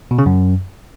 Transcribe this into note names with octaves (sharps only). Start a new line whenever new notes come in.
B2
C#3
F#2